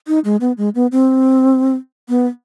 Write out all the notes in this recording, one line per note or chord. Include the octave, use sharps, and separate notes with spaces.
D#4
G#3
B3
G#3
B3
C4
B3